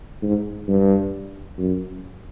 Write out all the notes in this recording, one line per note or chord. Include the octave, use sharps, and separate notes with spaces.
G#2
G2
F#2